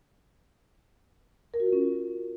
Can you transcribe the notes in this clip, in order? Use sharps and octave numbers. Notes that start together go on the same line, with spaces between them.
A#4
F#4
F4
C#4